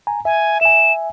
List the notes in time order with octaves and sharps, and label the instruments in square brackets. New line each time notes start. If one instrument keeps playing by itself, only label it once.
[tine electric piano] G#5 A#5
[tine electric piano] E5 [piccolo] G#5
[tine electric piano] E5 G#5 [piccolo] E7